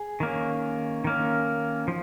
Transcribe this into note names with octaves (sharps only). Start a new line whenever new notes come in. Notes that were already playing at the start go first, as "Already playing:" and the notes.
Already playing: G#4
D#3 A#3 C#4
D#3 A#3 C#4
F3